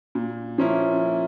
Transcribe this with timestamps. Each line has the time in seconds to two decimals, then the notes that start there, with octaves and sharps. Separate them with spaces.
0.15 A#2
0.58 F3 A#3 C#4 E4